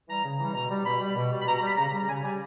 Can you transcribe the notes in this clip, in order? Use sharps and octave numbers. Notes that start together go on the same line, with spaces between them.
E3 G3 A#5
C#3
E3 G3
B2 A#5
G3
B2 B5
G3
B2
G3
B5
B2 A#5
A#5
G3 B5
C#3 A#5
A#5
G3
A#5
C#3 G#5
G3 G#5